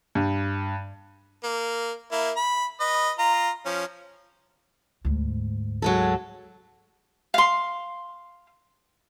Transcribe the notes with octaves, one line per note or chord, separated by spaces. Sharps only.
G2
A#3
A#3 E4
B5
B4 D#5
F4 A#5
F3 C#4
D2 G#2
F#3 G#3 A4
F5 C6